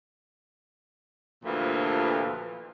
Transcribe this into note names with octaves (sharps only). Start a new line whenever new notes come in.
D2 G2 A#2 E3 F3